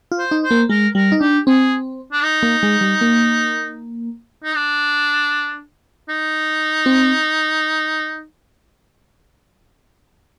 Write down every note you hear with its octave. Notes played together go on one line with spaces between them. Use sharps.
F4
C5
D#4
C5
A#3
G#3 A#4
G3 A#4
D#4
D4 G4
C4 G#4
D4
D#4
A#3
G#3
G3
A#3
D#4
D4
D#4
C4